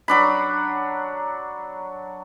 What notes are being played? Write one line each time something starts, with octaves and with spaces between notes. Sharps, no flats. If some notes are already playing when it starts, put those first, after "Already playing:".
F#3 D4 B5